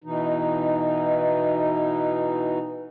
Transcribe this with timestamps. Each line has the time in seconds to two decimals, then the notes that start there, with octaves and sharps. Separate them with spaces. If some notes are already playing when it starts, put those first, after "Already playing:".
0.04 B2 E3 D#4